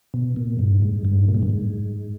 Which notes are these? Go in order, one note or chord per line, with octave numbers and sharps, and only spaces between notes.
B2
A#2
G2
G#2
G2
A#2
G#2
G2
G#2